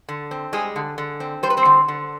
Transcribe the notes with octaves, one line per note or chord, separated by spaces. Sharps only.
D3
C4
G3 G#3 G#4
D3
D3
C4
G3 C5
B4
C4 C5
D3
D3